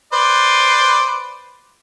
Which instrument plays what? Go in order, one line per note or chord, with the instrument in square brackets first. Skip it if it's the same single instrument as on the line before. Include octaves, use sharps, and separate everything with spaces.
[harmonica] B4 C5 D5